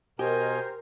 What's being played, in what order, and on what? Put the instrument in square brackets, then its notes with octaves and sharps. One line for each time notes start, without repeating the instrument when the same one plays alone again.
[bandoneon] B2 D#5 G#5 [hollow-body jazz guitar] G4 [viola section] A#4 [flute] C5